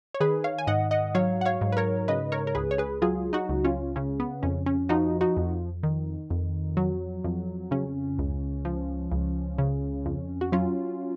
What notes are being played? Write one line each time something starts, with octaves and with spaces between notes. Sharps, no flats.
C#5
D#3 G#4 B4
C#5 F5
G#5
G#2 D#5 F#5
D#5 F#5
F#3 C#5 F5
F#5
C#5 F5
G#2
B4
A#4 C#5
C#3 B4 D#5
A#4 C#5
A#4
C#2 G#4 B4
C#5
G#4 B4
F#3 F4 G#4
D#4 F#4
C#2
C#4 F4
C#3 C#4
B3
F2 C#4
C#4
F3 D#4 F#4
D#4 F#4
F2
D#3
F2
F#3
F2
C#3 C#4
C#2
F3
C#2
C#3
F2
F#4
F#3 C#4 F4